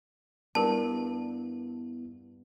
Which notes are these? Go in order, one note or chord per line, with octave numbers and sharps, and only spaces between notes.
G2 B3 E4 A#4 A5